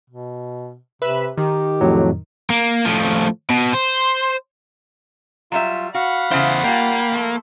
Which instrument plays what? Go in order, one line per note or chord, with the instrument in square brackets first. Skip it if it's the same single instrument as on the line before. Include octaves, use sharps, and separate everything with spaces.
[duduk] B2
[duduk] C3 [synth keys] B4 E5 B5
[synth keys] D#3 [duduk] G4
[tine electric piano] F2 A2 F#3
[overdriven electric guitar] A#3
A2 F3
B2
C5
[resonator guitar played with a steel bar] F#3 G3 E5 [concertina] F4
[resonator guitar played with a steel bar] F#4 [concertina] F5 [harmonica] F#5 B5
[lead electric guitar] E2 C5 [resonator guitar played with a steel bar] C#3 E4
[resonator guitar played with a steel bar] G3 F4 [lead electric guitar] A#3 [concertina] G5
[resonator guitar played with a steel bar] F3 A3